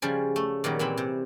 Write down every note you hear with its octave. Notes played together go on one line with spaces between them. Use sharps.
C#3 F3 G3 G#5
A3
A#2 D#3 F#3 G3
A#2 E3 C4 B5
C3